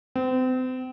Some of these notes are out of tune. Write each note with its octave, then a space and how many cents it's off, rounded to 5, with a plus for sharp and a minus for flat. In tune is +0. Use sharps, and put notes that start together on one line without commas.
C4 -35